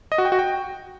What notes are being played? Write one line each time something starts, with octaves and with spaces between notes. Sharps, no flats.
D#5
F#4
G5
F#4
G5